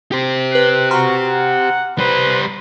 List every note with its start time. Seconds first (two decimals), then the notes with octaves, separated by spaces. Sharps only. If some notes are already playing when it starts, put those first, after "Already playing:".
0.12 G4 C5
0.52 B4 F#6 C7
0.91 F#4 A#5 C6 F6
1.25 F#5
1.98 G3 B4 C5